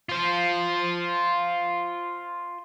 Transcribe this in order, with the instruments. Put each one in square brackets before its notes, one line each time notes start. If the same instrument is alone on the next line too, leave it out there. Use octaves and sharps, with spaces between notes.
[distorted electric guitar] F4 C5